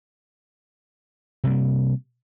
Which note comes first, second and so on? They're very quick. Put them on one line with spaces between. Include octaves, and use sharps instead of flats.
C3 G3 A#3